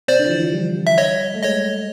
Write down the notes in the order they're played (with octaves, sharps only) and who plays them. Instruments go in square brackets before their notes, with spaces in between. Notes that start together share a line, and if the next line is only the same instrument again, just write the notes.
[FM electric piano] C3 [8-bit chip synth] C5 D5
[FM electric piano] D3
F3
E3
F3
G3
[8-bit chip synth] E5
C#5 D#5
[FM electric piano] A3
[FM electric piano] G#3 [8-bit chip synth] C#5 D#5